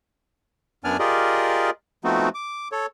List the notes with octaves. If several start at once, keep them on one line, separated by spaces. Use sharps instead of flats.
F#2 B3 D4 D5 G#5 F6
F4 G4 G#4 A#4 D5 D#5
F3 A3 B3 C4 D#4 F#4
D6
A4 C#5